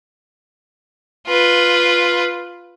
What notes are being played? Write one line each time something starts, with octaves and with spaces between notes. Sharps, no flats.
F4 B4